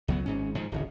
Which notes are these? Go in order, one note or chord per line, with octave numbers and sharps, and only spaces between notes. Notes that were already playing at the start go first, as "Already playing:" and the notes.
C#2 F#3 B3
G#1 G#2 C#4
G#2 D#3 F3
D1 G#1 C#3